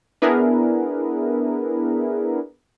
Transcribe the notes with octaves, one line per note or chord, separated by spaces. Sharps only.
B3 D4 E4 G#4 A#4 B4